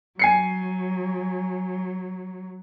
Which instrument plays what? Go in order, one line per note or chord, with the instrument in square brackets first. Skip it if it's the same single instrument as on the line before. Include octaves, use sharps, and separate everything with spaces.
[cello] F#3 [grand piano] G#5 C7 C#7